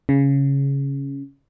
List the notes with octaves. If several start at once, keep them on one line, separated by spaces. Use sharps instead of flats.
C#3